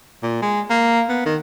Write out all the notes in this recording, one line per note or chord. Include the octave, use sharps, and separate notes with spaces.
A#2
G#3
A#3
B3
D#3